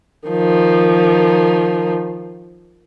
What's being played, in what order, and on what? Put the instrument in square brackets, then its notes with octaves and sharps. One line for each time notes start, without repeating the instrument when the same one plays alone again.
[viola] D#3 F3